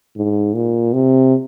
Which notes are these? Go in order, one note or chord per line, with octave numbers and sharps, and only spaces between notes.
G#2
A#2
C3